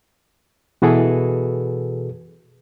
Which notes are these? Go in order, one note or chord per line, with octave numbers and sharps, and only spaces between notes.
B2 E3 F#4 G#4 A4 B4